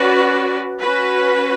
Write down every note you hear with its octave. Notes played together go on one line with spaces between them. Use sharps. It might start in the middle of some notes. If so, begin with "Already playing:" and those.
Already playing: C#4 F#4 B4 D5
C#4 F#4 B4